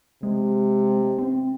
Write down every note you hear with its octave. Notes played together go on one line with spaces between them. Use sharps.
C3 G#3
C4